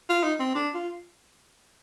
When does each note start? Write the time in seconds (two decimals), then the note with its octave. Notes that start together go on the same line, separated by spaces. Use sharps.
0.09 F4
0.23 D#4
0.40 C4
0.55 D4
0.74 F4